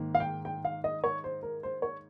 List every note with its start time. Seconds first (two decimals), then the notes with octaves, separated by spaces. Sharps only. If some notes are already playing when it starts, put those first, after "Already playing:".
Already playing: G#2 D#3 A#3
0.15 F5
0.20 G5
0.45 G5
0.65 F5
0.84 D#5
1.04 C#5
1.24 C5
1.43 A#4
1.63 C5
1.82 C#5